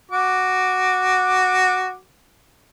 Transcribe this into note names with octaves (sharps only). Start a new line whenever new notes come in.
F#4 D6